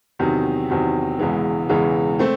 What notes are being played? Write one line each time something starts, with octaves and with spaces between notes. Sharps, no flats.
E2 C3 D#3 F#3
E2 C3 D#3 F#3
E1 E2 C#3 E3 G#3
E1 E2 C#3 E3 G#3
A3 C4